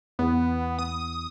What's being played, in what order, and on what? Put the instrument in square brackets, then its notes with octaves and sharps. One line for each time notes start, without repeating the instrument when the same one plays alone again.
[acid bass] E2 [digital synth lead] B3
[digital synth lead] D#6